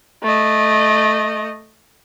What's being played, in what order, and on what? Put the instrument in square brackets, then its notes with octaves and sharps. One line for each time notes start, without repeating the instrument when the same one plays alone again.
[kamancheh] A3 D#5